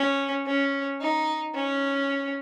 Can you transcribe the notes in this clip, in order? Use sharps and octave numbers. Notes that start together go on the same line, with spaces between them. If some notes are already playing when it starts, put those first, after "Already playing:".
Already playing: C#4
C#4
D#4
C#4